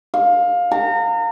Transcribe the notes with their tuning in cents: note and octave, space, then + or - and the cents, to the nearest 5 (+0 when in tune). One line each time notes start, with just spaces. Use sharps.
F5 +20
A#5 -35